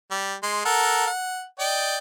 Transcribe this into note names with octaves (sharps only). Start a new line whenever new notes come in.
G3
G#3 C6
A4 A#4 F#5
F#5
D5 D#5 G5